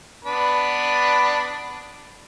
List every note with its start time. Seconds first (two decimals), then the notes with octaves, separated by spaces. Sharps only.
0.25 B3 D4 B4